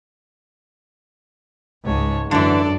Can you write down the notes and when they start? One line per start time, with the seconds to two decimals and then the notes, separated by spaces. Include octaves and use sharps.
1.84 C#2 G#2 C#5 A5
2.31 F#2 D3 E3 D4 A4 D5